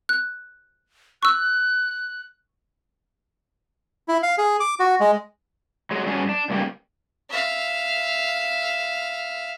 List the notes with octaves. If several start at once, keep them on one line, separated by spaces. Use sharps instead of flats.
F#6
C#6 E6 F#6
E4
F5
G#4
D6
F#4
G#3
F#3 G#3
G2 C#4 D4 F#4 G#4
D4
G2 C#3 A#3 F#4 G4
E5 F5